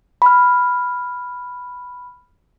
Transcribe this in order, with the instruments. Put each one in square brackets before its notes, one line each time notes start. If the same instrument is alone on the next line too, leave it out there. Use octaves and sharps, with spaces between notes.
[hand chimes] B5 F6